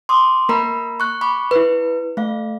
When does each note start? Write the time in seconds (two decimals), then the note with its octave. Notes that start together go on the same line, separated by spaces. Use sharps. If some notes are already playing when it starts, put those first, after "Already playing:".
0.09 C6 D6 D#6
0.49 A#3 A#4 A#5 B5
1.00 C#6 F#6
1.21 B5 C#6 D6
1.51 E4 B4
2.17 A3 F5